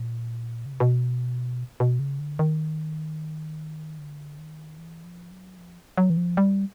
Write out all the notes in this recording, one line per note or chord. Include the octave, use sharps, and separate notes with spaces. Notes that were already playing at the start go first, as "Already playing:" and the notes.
Already playing: A#2
C#3
C3
B2
B2
C#3
D3
D#3
D3
D#3
E3
F3
F#3
F3
F#3
E3
F3
G3